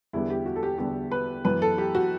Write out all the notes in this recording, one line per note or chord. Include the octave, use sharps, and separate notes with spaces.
E2 D3 G3 B3 E4
G4
F#4
A4
G4
E2 D3 G3 B3 G4
B4
F#2 E3 B3 B4
A4
G4
F#4